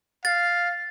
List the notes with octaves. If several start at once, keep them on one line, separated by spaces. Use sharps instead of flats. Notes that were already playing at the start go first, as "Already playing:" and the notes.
F5 A6